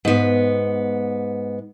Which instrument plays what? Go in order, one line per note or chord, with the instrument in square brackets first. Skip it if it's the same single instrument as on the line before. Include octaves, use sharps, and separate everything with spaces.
[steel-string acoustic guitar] G#2 B3